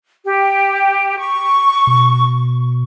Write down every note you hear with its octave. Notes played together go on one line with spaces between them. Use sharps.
G4
C#6
B2